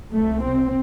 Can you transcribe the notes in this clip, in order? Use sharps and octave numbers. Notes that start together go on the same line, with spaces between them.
C2 C3 A3
C4